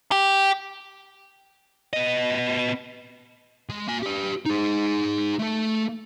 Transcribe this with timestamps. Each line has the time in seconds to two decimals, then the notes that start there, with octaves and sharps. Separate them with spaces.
0.12 G4
1.93 B3 D#5
3.69 G#3
3.87 A#3 G#5
4.03 G4 B4
4.46 D#4 G#4
5.39 A3 A4